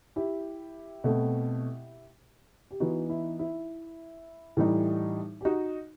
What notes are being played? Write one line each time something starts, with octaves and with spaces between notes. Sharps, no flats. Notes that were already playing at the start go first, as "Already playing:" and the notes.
E4 G4
B2 A3 C4
G4
E3 B3 D#4 F#4
E4
E4
A2 E3 G3 D#4
G4
D#4 F#4